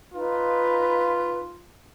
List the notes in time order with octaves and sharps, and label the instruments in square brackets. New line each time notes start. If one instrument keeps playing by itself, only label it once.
[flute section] D#4 B4 [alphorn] F4